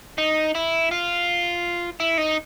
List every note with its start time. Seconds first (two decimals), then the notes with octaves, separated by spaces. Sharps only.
0.18 D#4
0.55 E4
0.91 F4
2.00 E4
2.18 D#4